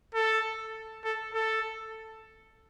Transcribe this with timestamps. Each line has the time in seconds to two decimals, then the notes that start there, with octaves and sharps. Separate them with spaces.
0.15 A4
1.04 A4
1.34 A4